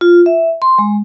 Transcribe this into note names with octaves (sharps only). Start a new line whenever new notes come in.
F4
E5
C6
G#3